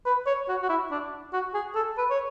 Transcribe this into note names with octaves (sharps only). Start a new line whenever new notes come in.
B4
C#5
F#4
F#4
E4
D4
F#4
G#4
A4
B4
C#5